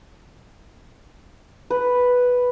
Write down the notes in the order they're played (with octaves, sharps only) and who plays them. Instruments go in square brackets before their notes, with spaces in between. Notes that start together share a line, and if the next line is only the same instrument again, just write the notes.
[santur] B4